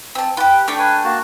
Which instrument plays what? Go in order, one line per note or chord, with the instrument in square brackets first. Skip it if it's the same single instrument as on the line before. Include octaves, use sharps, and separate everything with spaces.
[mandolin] C4 A5
[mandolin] F4 G4 [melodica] B4
[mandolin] A3 D4 G5 [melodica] C#6 D6
[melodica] B4 G#5
A#3 F#4 A5